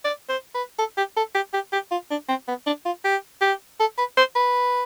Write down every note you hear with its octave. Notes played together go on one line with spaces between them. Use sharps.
D5
C5
B4
A4
G4
A4
G4
G4
G4
F4
D4
C4
B3
D4
F4
G4
G4
A4
B4
C5
B4